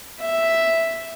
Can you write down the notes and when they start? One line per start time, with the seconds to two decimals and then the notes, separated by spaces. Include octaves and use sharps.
0.20 E5